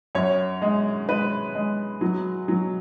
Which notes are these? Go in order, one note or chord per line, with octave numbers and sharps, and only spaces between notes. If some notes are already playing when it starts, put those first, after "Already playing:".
F#2 C#5
G#3
G#3 B4
G#3
F#3
F#3